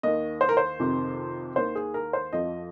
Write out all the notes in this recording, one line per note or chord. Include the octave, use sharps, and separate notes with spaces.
D#2 D#3 D#5
C5
A#4
C5
F2 C3 D#3
D#2 D#3 C5
G#4
A#4
C5
F2 F3 D#5